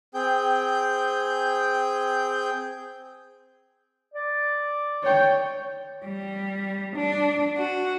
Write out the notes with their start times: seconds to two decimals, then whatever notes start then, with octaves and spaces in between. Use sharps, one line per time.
0.14 C4 G#4 G5 G6
4.14 D5
5.03 C#5 G5
6.04 G3
6.95 D4
7.57 F#4